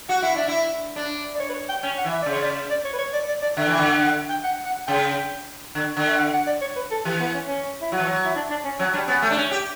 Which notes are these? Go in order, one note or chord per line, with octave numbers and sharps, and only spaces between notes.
F#4 F#5
E4 F#5
D4 E5
E4
D4
D5
C#5
B4
C#5
G5
C#4 G5
F#5
E3
E5
C#3 D5
C#5
D5
D5
C#5
B4
C#5
D5
D5
D5
D3 E5
E3 G5
D3
F#5
F#5
G5
F#5
F#5
C#3 G5
D3
D3
E5
F#5
F#5
D5
C#5
B4
A4
E3 G4
B3
C#4
C#4
E4
F#3 F#4
E3
F#3
E4
D4
D4
C#4
F#3 C#4
G3 D4
B3 C#4
A3
D4
C#4
G4